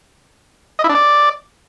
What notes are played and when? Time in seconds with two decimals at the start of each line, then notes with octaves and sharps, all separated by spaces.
0.79 D#5
0.84 E4
0.89 D4
0.95 D5